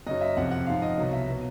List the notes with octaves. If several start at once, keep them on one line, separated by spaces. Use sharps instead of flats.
F#2 C#3 F#3 D#5
E5
F2 C3 F3 F#5
F#5
G#2 F3 F5
D#5
C2 B2 F#3
E5
B2 F#3